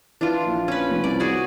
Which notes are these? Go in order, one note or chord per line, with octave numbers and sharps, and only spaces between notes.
E3 D4 F4
A#1
C#4 B4
F1
C2 D5
F#4 G#4 D5